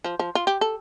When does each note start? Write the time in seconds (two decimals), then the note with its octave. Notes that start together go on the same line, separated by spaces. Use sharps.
0.04 F3
0.19 F3
0.35 F4
0.47 G4
0.61 A4